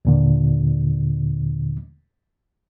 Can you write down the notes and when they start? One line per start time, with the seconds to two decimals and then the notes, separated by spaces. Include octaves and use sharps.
0.05 D#2 A#2 D3